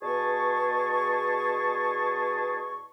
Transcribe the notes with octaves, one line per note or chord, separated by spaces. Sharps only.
E2 B2 G#4 A5 C#6